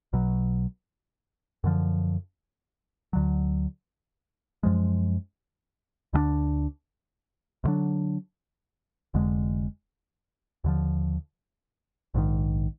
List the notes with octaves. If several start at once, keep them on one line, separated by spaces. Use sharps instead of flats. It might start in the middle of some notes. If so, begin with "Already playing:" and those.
B1 B2 F#3
F#2 D3 F3
D2 D3 F#3
F#2 F3 G#3
D2 D3 F#3 D4
D2 D3 F#3 D4
F1 F2 D3 G#3
D#2 D3 F3
A#1 G#2 D#3